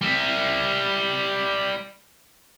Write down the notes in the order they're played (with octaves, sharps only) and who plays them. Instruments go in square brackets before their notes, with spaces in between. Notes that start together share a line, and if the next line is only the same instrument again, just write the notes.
[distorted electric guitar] G3 E5